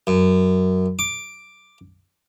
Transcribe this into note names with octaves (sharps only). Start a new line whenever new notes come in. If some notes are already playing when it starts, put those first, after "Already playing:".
F#2
D6